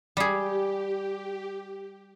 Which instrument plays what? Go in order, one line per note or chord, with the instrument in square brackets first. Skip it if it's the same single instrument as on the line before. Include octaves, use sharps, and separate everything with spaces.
[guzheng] G3 G#4 [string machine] G4